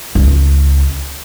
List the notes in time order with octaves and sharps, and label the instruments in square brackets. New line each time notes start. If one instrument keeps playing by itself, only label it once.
[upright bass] C#2